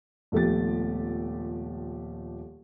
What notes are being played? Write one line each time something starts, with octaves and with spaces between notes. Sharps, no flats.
D#1 F3 A3 B3 G4 A6